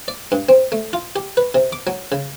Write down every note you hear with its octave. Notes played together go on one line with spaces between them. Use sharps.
D5
G2
C4
A3
F4
G4
B4
C3
D6
F#3
C#3